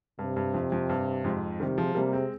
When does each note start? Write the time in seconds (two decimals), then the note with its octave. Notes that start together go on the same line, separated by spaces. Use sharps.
0.19 G2 C3
0.36 G2
0.54 F2
0.72 F2
0.89 G2
1.24 F2 G#2
1.60 C3 D#3 G3
1.77 F3 G#3
1.95 C3 G3 A#3
2.12 G#3 C4